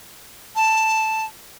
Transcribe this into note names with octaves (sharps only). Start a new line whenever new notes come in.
A5